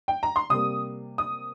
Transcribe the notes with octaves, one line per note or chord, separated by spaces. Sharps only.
G5
A#5
C6
C3 G3 A#3 D#6
D#6